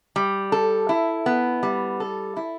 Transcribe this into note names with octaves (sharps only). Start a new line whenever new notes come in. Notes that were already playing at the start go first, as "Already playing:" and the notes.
G3
A4
E4
B3
G3
A4
E4